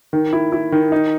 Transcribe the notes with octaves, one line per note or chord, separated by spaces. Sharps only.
D#3
E4
E4
D#3
D#4